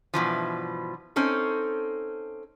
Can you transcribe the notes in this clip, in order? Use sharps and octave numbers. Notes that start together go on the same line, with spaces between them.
G2 B2 E3 F3
C4 C#4 D#4 A4